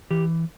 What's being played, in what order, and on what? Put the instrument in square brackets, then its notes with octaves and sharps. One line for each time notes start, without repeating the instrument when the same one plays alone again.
[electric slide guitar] E3 G4